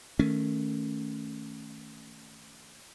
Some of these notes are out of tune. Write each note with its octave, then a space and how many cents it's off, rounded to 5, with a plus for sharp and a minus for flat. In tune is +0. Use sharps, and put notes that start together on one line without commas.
D#3 +0 A3 +0 C#4 +0